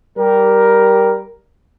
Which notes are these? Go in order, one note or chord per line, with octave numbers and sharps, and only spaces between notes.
G3 G4 A#4